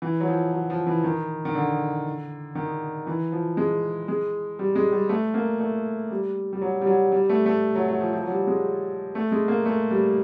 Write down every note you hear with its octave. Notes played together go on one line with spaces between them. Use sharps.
E3
F#3
F3
F#3
F3
E3
D#3
D#3
D3
D#3
E3
F3
G#3
G#3
G3
G#3
G3
A3
A#3
A3
G3
G3
F#3
G3
F#3
G3
A3
A3
F#3
F#3
F3
F3
F#3
G3
G#3
A3
G#3
A#3
A3
G3